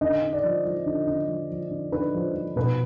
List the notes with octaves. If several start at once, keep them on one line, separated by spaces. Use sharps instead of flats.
D3 D#5
D3
D5
F3
F3
D3
D3
F3
F3
D3
D3 B4
F3
F3
B2 B4